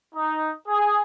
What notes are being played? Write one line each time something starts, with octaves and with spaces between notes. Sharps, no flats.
D#4
G#4